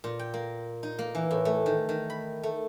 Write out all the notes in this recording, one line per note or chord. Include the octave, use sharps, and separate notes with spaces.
A#2
G5
A#3
D#4
A#3
E3
A2
A3
D#3
D#3
B5
A3